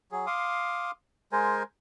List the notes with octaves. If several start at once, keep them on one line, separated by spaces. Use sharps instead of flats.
F#3 G#4
F5 C6 D6 D#6
G#3 A#4 C5 G#5